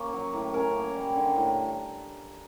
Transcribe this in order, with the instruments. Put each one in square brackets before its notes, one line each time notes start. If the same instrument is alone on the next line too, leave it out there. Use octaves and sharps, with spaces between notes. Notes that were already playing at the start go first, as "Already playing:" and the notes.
Already playing: [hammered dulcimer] A#3 C#4
F#3
A2
C#4 A#4
A#3
G3
D3
A2